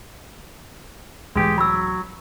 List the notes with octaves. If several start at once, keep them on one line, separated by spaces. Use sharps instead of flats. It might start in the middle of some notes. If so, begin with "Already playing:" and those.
C#2 A2 E3 G#3 G4
F#3 B5 E6